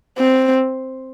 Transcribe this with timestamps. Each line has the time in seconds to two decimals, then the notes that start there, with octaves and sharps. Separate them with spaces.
0.18 C4